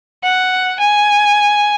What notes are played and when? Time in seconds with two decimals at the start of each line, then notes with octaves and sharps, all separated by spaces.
0.23 F#5
0.80 G#5